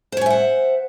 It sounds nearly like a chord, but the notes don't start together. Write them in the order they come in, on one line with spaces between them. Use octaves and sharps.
C5 C#5 G#5 E5 F#5